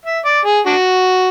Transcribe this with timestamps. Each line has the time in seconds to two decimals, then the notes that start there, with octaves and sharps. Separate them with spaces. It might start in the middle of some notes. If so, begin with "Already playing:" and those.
0.05 E5
0.25 D5
0.45 G#4
0.66 D4 F#4